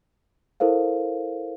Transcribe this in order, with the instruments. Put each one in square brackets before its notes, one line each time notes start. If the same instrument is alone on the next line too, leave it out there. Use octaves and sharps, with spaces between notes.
[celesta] E4 A4 A#4 C5 F5